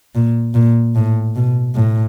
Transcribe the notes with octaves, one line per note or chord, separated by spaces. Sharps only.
A#2
A#2
A2
B2
A2